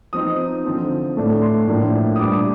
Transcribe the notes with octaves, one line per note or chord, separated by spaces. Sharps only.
F3 C4 D#4 D#6
D3 F3 C4
A2 A3 D4
C6
A2 F3 A#3 D4
D#6
A#2 G3 D4 D6